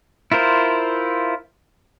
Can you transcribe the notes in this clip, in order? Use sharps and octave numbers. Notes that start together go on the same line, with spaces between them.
E4 F4 A#4 C5